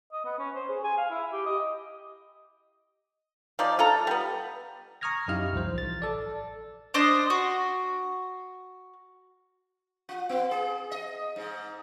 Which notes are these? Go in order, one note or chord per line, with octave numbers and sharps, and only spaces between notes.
D#5
B3
C#4
C5
G#4
G#5
F5
E4
G4
D#5
F3 D#4 D5
F4 A4 A#5
G3 B3
A#5 C#6 D#6 F6 G#6 A#6
F#2 D#4 E4 G4 F5 F6
C2 F3 C5
A1 A6
A4 D5
D4 C5 D#5 C6
F#4
F4
B3
G#4
D#5
G#2